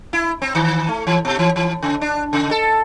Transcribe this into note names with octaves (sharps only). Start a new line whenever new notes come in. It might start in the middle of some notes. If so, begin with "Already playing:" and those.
E4
C4
D#3
A3
E3
B2
E3
E3
C#3
D4
C#3
A4